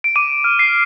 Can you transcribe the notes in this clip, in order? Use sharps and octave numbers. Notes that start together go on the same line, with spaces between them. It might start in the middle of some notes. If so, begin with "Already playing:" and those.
D7
D6 D#7
F6
C7